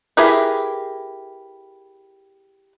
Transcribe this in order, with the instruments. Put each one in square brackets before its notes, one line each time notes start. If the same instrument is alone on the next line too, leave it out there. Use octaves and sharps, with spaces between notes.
[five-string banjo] E4 G4 G#4 A#4 B4